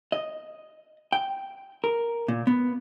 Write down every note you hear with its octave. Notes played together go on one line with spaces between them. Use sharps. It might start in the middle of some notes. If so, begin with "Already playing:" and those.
D#5
G5
A#4
A#2
B3